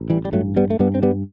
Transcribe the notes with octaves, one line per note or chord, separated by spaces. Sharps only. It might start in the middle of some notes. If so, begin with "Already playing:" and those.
Already playing: A1
E3 G3
G3
G2 F#3 A3
G3 B3
A3
G2 G3 B3
C4
G3 B3